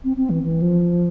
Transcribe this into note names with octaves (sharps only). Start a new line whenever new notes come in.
C4
C4
E3
E3
F3